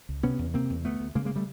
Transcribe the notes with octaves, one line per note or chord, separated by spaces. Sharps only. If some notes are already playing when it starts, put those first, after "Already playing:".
C#2
C3 B3 C#4
E2
C3 A#3 C4
E2
D2 A3 B3
D2
C#3 G#3 A#3
G#3 A#3
G3 A3